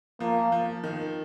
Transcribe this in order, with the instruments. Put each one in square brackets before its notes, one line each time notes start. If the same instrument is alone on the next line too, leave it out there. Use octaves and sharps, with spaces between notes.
[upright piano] F3 [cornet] A#3
[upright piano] F3
D#3